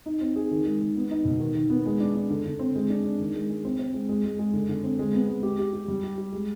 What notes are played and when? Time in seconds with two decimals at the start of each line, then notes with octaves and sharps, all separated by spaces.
0.06 D#4
0.21 C4
0.36 G#4
0.51 D#3
0.66 G#3
0.81 D#3
0.96 B3
1.11 D#4
1.25 B2
1.40 D#3
1.55 D#3
1.70 B3
1.86 G#3
2.00 D4
2.15 D4
2.30 D3
2.46 D3
2.59 C4
2.75 G#3
2.90 D4
3.04 D4
3.20 D#3
3.34 G#3
3.50 G#3
3.65 C4
3.79 C4
3.94 G#3
4.09 G#3
4.25 G#3
4.39 G#3
4.53 D3
4.69 D3
4.83 C4
4.99 G#3
5.14 B3
5.29 G#3
5.43 G4
5.59 G4
5.73 G4
5.88 G3
6.04 G4
6.18 G4
6.33 G#3